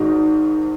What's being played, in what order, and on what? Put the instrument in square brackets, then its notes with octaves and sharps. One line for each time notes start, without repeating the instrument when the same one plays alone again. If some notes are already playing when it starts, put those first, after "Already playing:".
Already playing: [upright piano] G#1 G#2 D#3 D#4 F#4